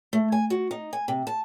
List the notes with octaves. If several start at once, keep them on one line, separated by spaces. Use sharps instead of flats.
A3
G#5
F#4
D#4
G#5
C3
A5